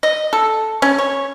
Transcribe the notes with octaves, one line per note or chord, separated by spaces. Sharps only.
D#5
A4
C#4
C#5